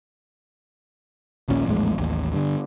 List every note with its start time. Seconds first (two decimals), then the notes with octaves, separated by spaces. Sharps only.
1.48 A#1 D#2 A#2 C#4
1.66 A#1 E2 A2 G#3
1.98 A1 D#2
2.33 G2 D3